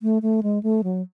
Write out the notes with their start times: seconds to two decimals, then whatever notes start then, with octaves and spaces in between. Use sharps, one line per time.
0.02 A3
0.22 A3
0.43 G#3
0.63 A3
0.84 F#3